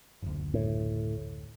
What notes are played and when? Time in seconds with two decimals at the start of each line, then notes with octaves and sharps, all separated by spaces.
0.22 F#1 D2
0.54 A2